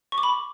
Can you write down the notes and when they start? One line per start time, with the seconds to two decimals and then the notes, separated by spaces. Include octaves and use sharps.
0.12 C#6
0.18 D6
0.23 B5